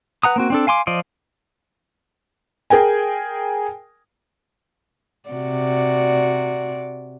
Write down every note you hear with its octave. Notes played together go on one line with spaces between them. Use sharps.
B4 F#5 A#5 D#6
A#3 C4 F#4
C4 D4 A4
F5 G#5 C6 D6
F3 F4 C5 D5 D#5
G#4 A#4 G5 G#5
C3 F#4 D5